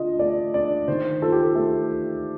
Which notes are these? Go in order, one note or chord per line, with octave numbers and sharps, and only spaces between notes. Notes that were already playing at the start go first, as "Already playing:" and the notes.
Already playing: D3 F4 D#5
A3 D5
D4 D5
D#3 C5
F4 A4
G4
A4
A3 A4